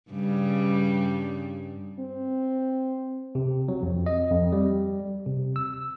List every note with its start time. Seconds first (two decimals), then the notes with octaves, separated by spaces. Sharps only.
0.11 G2 C#3 G3
2.00 C4
3.35 C3
3.68 F#3
3.83 F2
4.06 D#5
4.31 F2
4.52 G3
5.26 C3
5.56 E6